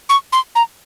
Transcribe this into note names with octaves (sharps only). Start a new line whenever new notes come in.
C#6
C6
A#5